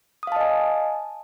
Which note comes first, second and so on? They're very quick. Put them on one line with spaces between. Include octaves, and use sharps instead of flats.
D#6 F5 A5 D#5 G#5